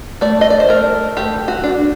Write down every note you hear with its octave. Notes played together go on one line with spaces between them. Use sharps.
A3 D5
D#5
D5
C5
A3 A#4
A3 G4
F#4
D4